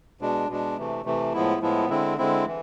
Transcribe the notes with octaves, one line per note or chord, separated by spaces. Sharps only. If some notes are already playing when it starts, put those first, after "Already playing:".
B2 G#3 D4
B2 G#3 D4
C3 E3 A3
C3 E3 A3
A2 F3 G#3 B3 E4
A2 F3 G#3 B3 E4
D3 G#3 C4 E4
D3 G#3 C4 E4
E3